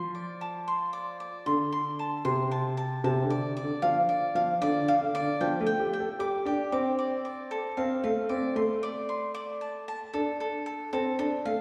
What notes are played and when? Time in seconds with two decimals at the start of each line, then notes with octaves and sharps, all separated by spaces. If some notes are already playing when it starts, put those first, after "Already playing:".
Already playing: F3 C6
0.15 D5
0.41 A5
0.68 C6
0.93 D5
1.20 D5
1.46 D3 C6
1.72 C6
1.99 A5
2.25 C3 C6
2.51 A5
2.77 A5
3.04 C3 A5
3.24 D3
3.30 D5
3.57 D5
3.63 D3
3.82 F3 F5
4.09 D5
4.35 F3 F5
4.61 D3 D5
4.82 D3
4.88 F5
5.01 D3
5.15 D5
5.21 D3
5.41 F3 G5
5.60 A3
5.66 G5
5.80 G4
5.93 G5
6.00 A4
6.19 G4 D6
6.46 D4 G4
6.72 C4 D6
6.99 D5
7.25 D5
7.51 A4
7.77 C4 F5
8.04 A3 F5
8.29 C4 D5
8.56 A3 C6
8.83 D5
9.09 C6
9.34 D5
9.61 A5
9.88 A5
10.14 D4 A4
10.40 A4
10.66 A4
10.93 C4 A4
11.19 D4 A4
11.45 A3 F5